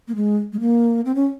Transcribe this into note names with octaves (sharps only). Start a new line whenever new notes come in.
A#3
G#3
G#3
A#3
C4
C#4